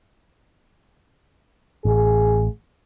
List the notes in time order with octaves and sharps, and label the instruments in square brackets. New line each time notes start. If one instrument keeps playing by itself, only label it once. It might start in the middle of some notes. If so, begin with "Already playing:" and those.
[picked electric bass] A1 [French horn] G#4